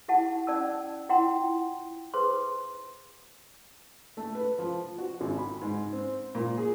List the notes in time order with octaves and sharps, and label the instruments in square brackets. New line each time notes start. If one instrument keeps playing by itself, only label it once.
[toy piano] D#4 E4 G4 F#5 A5
C#4 D5 A5 E6
E4 F4 F#5 G5 A#5 C6
G#4 B4 C5 C6
[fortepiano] A3
B4
F3
F#4
G#1
B5
G#2
C4
A#2
G#4